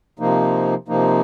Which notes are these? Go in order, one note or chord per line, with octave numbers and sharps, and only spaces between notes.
C3 F3 A#3 D#4
C3 F3 A#3 D#4